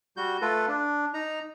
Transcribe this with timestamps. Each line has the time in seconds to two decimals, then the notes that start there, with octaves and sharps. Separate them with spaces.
0.17 G3 F#4 G6
0.41 A3 F4 A4 B4
0.68 D4
1.14 D#4 A#5